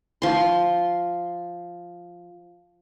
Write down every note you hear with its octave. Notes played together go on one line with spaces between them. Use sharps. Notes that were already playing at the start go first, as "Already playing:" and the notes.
F3 C6